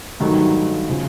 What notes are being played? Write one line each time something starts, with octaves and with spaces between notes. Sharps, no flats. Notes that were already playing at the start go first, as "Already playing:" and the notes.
G#1 G2 D#3 F#3 A3
C#3 F3